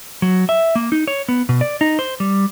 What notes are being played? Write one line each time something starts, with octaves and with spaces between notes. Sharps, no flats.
F#3
E5
A#3
D#4
C#5
B3
B2
D5
D#4
C5
G3